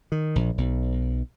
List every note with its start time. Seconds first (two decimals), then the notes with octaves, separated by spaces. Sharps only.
0.12 D#3
0.36 A#1
0.58 B1